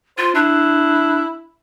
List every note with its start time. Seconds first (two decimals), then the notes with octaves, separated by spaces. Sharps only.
0.18 F4 C5
0.35 D4 E4